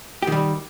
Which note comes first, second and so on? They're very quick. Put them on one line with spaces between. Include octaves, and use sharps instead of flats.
G4 D#3 G3